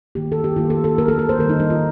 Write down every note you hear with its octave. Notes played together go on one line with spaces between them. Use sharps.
D#3 A#3 G4
A4
G4
D#3 A#3 F4
A4
A4
D#3 A#3 A#4
A4
A4
C5
D#3 G3 A#3 A#4
D#4
D#4
F4